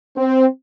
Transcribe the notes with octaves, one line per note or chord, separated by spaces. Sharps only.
C4